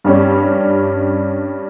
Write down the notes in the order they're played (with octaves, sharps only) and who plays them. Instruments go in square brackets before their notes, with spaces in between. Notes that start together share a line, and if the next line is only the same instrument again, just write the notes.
[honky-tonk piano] G2 G3 C#4